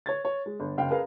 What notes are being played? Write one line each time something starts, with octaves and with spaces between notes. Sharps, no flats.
C#5 G#6 A6
C#5
G#3
G1
F#1 F5 G5
G#4 A#4 B4 F5